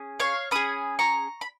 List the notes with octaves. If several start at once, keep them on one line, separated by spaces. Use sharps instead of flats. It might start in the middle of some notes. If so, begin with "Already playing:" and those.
Already playing: C#4 G#4
C#5 F5
C#4 G#4 B5 D#6
A#5 C#6
B5